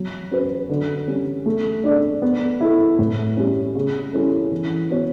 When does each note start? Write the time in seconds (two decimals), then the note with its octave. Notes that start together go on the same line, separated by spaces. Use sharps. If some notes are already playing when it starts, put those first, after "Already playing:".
Already playing: F#3
0.31 C#4 F#4 B4
0.69 D3
1.08 G3 C#4
1.46 A3
1.84 D4 A4 D5
2.22 B3
2.61 E4 A4
2.99 A2
3.37 G3 C#4
3.75 C#3
4.13 G3 C#4 E4 A4
4.52 E3
4.90 B3 F#4 C#5